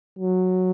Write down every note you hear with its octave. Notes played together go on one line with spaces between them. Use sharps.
F#3